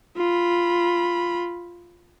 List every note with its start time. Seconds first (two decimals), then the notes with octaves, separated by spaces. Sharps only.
0.17 F4 B5